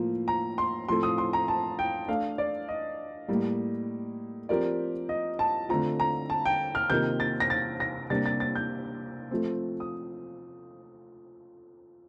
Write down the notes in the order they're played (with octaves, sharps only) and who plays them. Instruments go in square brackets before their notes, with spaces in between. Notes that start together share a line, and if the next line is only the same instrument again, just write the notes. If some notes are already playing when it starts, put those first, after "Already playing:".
Already playing: [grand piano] A2 F3 A#3 F4
[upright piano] A#5
C6
[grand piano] A2 F3 C4 F4 A4 [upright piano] C6
[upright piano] D#6
C6
A#5
A5
G5
[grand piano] A3 D4 A4 [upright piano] F5
[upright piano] D5
D#5
[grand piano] A2 G3 A#3
F3 C4 G4 A#4 D5
[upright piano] D#5
A5
[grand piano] D3 A3 C4 F4 [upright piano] A#5
[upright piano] A#5
A5
G5
F6
[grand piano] C3 D#3 A#3 F4 A#4 [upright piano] G6
[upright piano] A6
A#6
A6
A#6
[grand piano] C3 G3 A#3 D4 [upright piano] A6
[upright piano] A6
A6
G6
[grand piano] F3 A3 C4
[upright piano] D#6